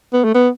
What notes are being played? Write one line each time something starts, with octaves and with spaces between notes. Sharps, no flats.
B3
A3
B3